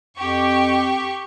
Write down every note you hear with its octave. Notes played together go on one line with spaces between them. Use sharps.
F2 G4 C#6